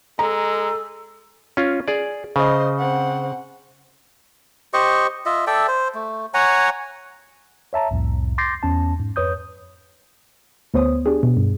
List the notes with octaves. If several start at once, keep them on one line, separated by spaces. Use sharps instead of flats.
G#3 A4 A#5
C#4 F4
G#4 D5
C#3 C5 D#5
C4 F#5
G4 C5 D#5 C#6
F4 D#5 E5
A4 D5 E5 G5
C5
A3
C#5 F#5 G#5 A#5
C#5 E5 A5 A#5
C2 F2 A2
C6 D6 G6 A6 A#6 C7
E2 C#4 A5
G#2
F2 B4 C#5 D#6 G6
D2 B3 C5 C#5 D#6
D4 G4 G#4
B2
G2